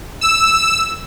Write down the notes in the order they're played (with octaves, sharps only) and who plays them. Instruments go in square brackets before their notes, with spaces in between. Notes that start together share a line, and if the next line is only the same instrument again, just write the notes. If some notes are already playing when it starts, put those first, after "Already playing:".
[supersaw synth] E6